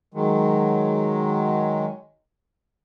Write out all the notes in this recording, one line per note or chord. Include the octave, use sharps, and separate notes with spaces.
D#3 F#3 G#3